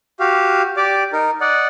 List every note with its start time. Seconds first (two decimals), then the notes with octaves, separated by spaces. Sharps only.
0.20 F#4 G4 F5
0.77 G4 D5 D6
1.13 D#4 A#4
1.41 D5 D#5 F#5